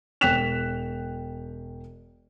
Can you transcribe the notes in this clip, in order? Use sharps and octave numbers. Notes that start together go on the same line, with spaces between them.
E1 G5 F#6 B6 E7 F7